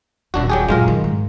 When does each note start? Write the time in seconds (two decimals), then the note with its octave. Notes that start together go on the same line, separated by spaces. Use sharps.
0.34 D#1 F#2 D4 F#4
0.50 F#3 G4 G#4
0.69 F#2 A#2 G#3 F4 A#4
0.88 D#3
1.04 G#2